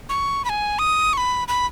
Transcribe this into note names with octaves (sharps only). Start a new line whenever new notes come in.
C#6
B5
G#5
D#6
C#6
B5
B5